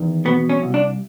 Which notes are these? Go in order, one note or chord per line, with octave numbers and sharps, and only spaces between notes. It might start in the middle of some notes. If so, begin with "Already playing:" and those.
Already playing: E2 D#3
B2 B3
C#4
C2
D4